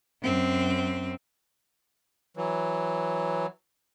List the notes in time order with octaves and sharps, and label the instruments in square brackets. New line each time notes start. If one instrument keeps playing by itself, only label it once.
[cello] F#2 C4
[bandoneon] E3 F#3